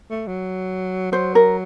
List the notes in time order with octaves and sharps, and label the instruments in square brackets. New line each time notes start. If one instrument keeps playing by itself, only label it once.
[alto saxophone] A3
F#3
[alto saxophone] F#3 [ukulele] C5
[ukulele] A#4